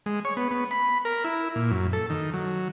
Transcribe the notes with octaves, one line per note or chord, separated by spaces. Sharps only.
G#3
C#5
B3
B3
B5
A#4
E4
A#2
F#2
A4
D#3
F#3